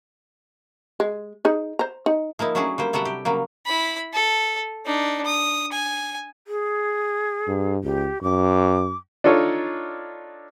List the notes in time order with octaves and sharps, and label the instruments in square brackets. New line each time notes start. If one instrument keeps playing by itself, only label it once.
[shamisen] G#3
D#4 G#4
C5 A#5
D#4
[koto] F3 A#3 D#4 E4
F#3 A3 C#4 D4 F#4 G#4
G3 A#3 C5
C3 F#3 G3 A4 E5 F#5
G4
C#3 F#3 G3 A#3
[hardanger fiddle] E4 B5
A4
D4 D#4
D#6
G#5
[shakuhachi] G#4
[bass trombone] G2
[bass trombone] C#2 [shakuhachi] G4
[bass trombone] F#2 [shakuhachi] D6
[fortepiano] D4 D#4 F4 A4 C#5